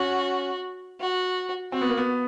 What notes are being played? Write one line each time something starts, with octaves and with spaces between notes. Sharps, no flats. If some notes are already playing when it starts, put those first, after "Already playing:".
Already playing: C#4 F#4
F#4
C4 F#4
B3
A#3
B3